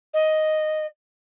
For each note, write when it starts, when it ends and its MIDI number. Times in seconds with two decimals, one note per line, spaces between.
0.13 0.86 75